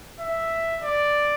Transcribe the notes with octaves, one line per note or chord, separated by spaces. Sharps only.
E5
D5